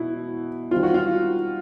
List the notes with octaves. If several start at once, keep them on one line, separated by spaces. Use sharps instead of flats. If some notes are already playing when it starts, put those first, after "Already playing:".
Already playing: B2 E4
D#3 G3 C4 F4
F#4
F4